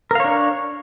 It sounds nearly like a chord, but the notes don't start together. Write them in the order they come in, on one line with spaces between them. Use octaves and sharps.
A#4 F5 C#5 D4